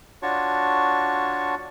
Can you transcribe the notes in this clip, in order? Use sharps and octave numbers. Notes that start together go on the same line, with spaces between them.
D4 F4 F#4 C#5 A5 C#6